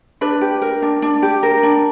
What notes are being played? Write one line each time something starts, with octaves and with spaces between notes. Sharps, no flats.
D4 B4
G4
A#4
D4
D4
G4
A#4
D4